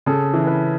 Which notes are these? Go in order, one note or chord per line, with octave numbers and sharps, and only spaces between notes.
C#3 A4
E3
B4